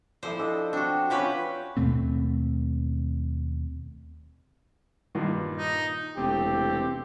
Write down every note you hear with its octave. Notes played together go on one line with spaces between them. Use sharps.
F3 E4 A4 C5 D5
D4 A4 D#5
C4 D4 F#4 A4
C4 C#4 F4 G4 B4 F#5
D#2 B2 A3 C4
G2 A#2 D#3
D#4
E1 C3 A3 C4 G4